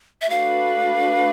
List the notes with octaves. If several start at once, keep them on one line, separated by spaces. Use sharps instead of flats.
E5
A3 D4 F#4 B4 F5